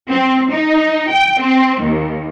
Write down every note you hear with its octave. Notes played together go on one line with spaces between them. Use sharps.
C4
D#4
G5
C4
D#2